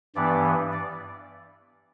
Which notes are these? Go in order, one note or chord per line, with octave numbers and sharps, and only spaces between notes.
G2 E3 B3 D5
D5